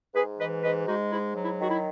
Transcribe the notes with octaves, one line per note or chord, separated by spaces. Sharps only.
G#2 G#4 B4
E3 B4 D#5
G#2 B4 D#5
G#3 D#4 F#4
G#2 E4
F#3
E4
D#3 F#4
E4